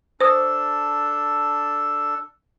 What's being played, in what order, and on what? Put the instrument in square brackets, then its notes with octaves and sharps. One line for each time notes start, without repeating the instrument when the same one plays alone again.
[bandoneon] D4 A4 [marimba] C5 D#6